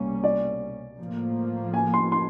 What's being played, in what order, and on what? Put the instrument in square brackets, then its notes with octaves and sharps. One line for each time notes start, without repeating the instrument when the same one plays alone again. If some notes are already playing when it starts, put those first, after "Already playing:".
Already playing: [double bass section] C2 B2 G3 A#3 C#4
[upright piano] D5
[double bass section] A2 F3 A#3
[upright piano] G#5
C6
C6